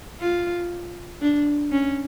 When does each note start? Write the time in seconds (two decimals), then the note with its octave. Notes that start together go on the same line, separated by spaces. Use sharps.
0.20 F4
1.21 D4
1.71 C#4